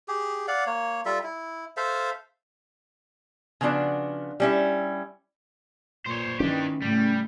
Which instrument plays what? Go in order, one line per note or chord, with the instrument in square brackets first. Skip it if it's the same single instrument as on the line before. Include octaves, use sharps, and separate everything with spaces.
[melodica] G4 G#4
D5 F5 F#5
A#3 C#5
G3 F4 A4 E5
E4
A4 C5 E5 F5
[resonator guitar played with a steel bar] C#3 F3 B3 D4 F#4
G3 C#4 E4
[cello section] A#2 [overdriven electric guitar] C5 C#5
[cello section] D#3 E3 [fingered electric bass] C#4 [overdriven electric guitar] D4 G4
[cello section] A2 C#3 A3 [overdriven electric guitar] G3